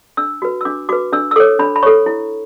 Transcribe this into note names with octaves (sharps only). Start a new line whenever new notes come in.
D4 E6
F#4 B4
E6
D4 D6
F#4 B4 D6
D4 E6
E6
A4 C#5 D6
D4 B5
B5
A4 C#5 C#6
E4